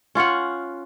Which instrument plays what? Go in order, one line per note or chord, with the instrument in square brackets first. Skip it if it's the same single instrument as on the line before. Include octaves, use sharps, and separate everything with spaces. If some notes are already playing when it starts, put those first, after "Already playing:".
[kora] C#4 F4 C#5 F#5